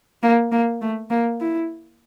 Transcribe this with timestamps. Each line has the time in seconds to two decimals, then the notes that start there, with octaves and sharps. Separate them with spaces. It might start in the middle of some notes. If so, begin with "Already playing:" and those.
0.23 A#3
0.52 A#3
0.81 A3
1.10 A#3
1.40 E4